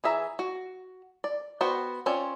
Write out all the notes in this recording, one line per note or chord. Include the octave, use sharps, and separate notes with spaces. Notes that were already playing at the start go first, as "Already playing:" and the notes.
E3 G#4 E5 A#5
F#4
D5
B3 F#4 C5 G5
C4 C#4 F4 C#5 D5